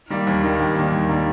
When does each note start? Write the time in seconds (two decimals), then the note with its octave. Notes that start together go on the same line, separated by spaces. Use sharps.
0.10 D#3 G3 A#3
0.27 D#2
0.43 D#3 G3 A#3
0.60 D#2
0.75 D#3 G3 A#3
0.92 D#2
1.09 D#3 G3 A#3